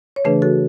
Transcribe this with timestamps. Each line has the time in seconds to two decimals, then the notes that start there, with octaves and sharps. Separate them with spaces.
0.16 C#5
0.25 C#3 E3 A3 D4 G#4 B4
0.42 F#4 A4